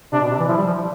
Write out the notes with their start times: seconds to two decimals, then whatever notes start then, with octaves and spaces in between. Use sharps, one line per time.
0.12 C3 D4
0.21 B2
0.30 C3
0.39 E3
0.48 F3 E4
0.57 G3
0.66 F3